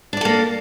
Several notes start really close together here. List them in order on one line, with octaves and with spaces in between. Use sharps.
D4 D5 A4 A#3